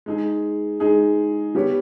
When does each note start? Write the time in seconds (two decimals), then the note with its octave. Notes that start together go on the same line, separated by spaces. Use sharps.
0.06 G#3 D#4 G#4
0.80 G#3 D#4 G#4
1.55 G3 B3 G4 C#5